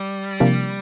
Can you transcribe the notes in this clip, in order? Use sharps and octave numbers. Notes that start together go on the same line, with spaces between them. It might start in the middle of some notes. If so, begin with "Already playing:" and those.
Already playing: G3
C3 F3 A#3 D4